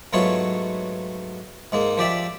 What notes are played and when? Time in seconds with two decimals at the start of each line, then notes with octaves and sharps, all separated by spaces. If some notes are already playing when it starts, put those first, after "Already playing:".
0.13 G#2 F#3 A3 B3 F4 C#5
1.72 G#2 G#3 A#3
1.98 F3 G4 D5 E5